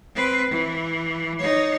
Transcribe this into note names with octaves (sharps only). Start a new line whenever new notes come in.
C4 B4
E3
D#4 C#5